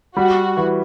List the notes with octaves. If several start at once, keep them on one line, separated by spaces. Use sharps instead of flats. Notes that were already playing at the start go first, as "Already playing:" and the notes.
G3 F#4
E3